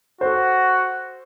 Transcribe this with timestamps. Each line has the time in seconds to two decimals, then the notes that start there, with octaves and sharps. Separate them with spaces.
0.21 F#4 A4 C5